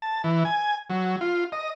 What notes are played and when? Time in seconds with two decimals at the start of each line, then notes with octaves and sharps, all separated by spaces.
0.02 A5
0.24 E3
0.45 G#5
0.90 F#3
1.21 F4
1.52 D#5